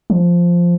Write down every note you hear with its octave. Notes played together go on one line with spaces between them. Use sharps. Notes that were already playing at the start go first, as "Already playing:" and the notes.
F3